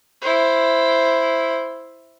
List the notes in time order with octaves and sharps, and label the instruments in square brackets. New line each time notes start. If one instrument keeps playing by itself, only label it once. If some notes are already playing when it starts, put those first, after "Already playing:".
[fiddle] E4 C5